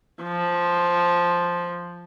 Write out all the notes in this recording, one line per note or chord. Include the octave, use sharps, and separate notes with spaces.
F3